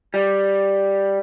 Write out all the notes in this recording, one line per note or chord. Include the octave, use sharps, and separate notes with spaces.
G3